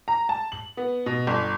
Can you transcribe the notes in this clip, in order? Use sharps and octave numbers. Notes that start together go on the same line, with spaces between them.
A#5
A5
F#7
B3
B2
G1